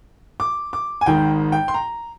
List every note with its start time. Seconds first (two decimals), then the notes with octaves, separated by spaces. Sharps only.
0.40 D6
0.73 D6
1.01 G#5
1.06 G#1 G#2 D#3 G5
1.52 G5
1.68 C6
1.74 A#5